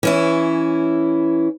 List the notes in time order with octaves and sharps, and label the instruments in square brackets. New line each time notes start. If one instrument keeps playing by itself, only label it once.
[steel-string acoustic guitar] E3 C#4 E4